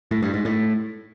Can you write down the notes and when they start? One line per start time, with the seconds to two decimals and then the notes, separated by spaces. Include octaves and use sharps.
0.11 A2
0.23 G2
0.34 G#2
0.45 A2